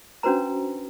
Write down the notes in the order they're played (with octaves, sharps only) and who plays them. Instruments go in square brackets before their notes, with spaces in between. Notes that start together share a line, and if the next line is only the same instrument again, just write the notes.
[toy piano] C#4 D4 F#4 B4 C5 A#5